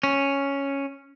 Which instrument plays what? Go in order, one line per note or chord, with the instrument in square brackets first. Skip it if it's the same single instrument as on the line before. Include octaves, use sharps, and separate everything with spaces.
[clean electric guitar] C#4